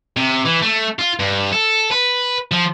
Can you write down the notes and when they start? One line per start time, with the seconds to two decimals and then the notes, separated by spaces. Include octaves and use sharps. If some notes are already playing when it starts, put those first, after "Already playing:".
0.17 C3
0.45 E3
0.62 A3
0.99 F4
1.19 G2
1.52 A4
1.91 B4
2.52 F3